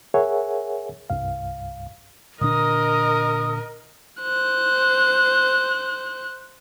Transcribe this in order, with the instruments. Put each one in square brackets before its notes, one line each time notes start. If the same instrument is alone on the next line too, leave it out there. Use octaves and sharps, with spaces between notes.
[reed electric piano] G#4 A#4 C#5 E5 F#5 G#5
C2 G2 F5
[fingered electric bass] A#2 D3 D4 [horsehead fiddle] A#4 D#5 [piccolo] D#6
[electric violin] C5 F#6